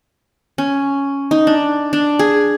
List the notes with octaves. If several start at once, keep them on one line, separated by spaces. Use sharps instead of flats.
C#4
D#4
D4
D4
G#4